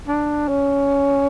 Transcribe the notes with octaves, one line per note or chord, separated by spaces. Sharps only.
D4
C#4